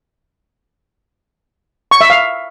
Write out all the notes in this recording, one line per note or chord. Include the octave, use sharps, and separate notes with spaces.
C#6
E5
F5